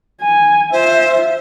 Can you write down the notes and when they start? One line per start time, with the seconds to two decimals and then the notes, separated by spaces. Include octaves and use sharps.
0.22 G#5
0.72 F4 C5 E5